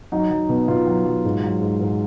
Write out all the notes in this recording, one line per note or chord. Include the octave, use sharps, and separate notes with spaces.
F#3 D#4
F#3
B2
B2 F4
F#3
F#3
G#2
F#3
G#2
G#2